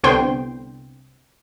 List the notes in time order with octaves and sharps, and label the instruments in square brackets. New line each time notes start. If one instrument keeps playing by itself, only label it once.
[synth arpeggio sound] C2 D3 B3 C5 G5 C6